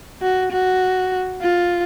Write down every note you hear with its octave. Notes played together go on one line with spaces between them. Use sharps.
F#4
F#4
F4